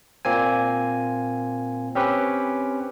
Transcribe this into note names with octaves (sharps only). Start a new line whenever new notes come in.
A#2 A#3 C4 G#5
C4 C#4 G4 B4